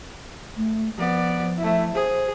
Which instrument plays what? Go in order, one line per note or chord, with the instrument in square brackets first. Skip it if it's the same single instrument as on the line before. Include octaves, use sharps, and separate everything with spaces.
[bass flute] A3
[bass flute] F3 [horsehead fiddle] B3 D5
[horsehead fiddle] A3 E4
[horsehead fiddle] G#4 [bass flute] C5